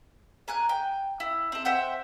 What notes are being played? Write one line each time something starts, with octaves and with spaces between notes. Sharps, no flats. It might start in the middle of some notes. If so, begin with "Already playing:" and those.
A#4 G#5 F#6
G5
E4
C4 A4
C5 E5 F#5 G5